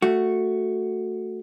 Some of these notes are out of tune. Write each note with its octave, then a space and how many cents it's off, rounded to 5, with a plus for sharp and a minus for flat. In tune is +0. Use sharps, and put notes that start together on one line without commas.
A3 +10 F#4 +0